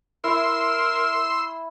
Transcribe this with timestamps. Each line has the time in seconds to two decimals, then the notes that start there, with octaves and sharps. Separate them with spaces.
0.24 E4 A#4 C6 E6